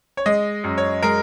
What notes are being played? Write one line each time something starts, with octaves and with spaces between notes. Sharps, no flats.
C#5
G#3 D#5
F#2
C#5
G#3 A#4